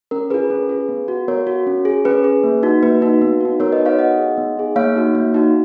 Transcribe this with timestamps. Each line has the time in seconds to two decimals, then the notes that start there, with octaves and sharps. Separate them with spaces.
0.11 C#4 A#4
0.30 F4 G#4 B4
0.50 C#4
0.69 F4 G#4
0.89 B3
1.08 F#4
1.28 B3 A#4 C#5
1.47 F#4
1.67 C#4
1.85 G#4
2.05 C#4 B4
2.24 G#4
2.44 A#3
2.63 D#4 F#4
2.83 A#3 B4
3.02 D#4 F#4
3.21 B3
3.41 D#4 F#4
3.60 B3 A#4 C#5
3.72 B4 D#5
3.79 D#4 F#4
3.86 C#5 F5
3.99 B3 D#5 F#5
4.18 D#4 G#4
4.37 B3
4.57 D#4 G#4
4.76 A#3 C#5 F5
4.96 D#4 F#4
5.15 A#3
5.34 D#4 F#4